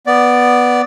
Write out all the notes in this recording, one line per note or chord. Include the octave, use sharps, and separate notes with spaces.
B3 D5